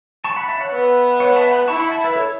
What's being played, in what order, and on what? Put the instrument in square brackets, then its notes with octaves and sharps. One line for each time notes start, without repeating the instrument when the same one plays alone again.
[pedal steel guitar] A5 C#6
F#5 B5
E5 A5
C#5 F#5
[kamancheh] B3 [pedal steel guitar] B4 E5
[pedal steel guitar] C#5 F#5
E5 A5
F#5 B5
[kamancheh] E4 [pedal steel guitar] A5 C#6
[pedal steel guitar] F#5 B5
E5 A5
B4 E5
A4 C#5